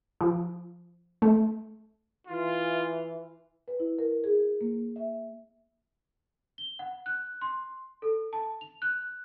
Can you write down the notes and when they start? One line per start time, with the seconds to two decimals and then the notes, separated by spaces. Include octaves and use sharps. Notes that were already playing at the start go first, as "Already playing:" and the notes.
0.21 F3
1.22 A3
2.27 E3 F4
3.68 B4
3.80 E4
3.99 A#4
4.24 G#4
4.61 A#3
4.96 E5
6.58 G7
6.79 F#5
7.06 F#6
7.41 C6
8.02 A4
8.33 A5
8.61 F7
8.82 F#6